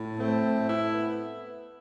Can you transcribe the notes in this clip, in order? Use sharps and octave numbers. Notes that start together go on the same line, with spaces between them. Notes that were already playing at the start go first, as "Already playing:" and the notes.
Already playing: A2
A3 C4
A2
E4
B3